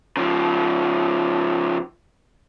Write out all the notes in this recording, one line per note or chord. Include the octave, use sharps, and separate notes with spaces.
C#3 F3